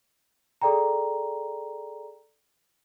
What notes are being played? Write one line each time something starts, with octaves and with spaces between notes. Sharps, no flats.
G#4 A4 D5 G5 A#5